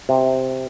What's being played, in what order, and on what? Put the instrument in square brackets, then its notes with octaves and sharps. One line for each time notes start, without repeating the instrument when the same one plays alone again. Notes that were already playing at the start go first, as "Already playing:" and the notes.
[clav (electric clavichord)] C3